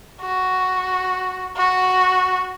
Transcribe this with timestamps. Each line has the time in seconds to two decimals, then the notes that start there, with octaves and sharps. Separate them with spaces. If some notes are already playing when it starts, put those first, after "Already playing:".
0.21 F#4
1.56 F#4